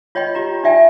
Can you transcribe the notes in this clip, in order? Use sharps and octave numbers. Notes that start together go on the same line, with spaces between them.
F4 C#5 D#5 G5 B5
F4 G4 A#5
D#4 D5 E5 G5 G#5